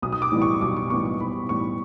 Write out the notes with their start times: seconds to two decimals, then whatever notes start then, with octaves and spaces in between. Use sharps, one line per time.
0.02 B1 D#6
0.12 D#6
0.22 D6
0.32 A2 E3 G3 B3
0.42 C#6
0.61 B1 D6
0.77 C#6
0.90 A2 E3 G3 B3 C#6
1.05 C#6
1.20 B1 B5
1.49 A2 E3 G3 B3 C#6